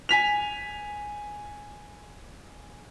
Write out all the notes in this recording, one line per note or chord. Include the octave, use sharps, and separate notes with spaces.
G#5 B6 F7